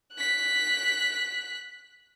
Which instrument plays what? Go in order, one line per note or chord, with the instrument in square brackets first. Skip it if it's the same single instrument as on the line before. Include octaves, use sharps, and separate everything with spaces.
[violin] F#6 B6